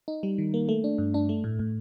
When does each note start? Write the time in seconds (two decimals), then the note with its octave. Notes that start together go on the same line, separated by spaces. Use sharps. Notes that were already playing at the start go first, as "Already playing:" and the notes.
0.08 D#4
0.23 G3
0.38 D#3
0.54 A#3
0.69 A3
0.84 D4
0.98 G2
1.14 D4
1.29 A3
1.44 A2
1.59 A2